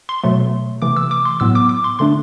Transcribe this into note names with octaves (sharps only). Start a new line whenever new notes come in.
C6
B2 F#3 A3
C3 E3 A3 D6
E6
D6
C6
A2 F#3 B3 E6
D6
D6
C6
D3 A3 D4 C6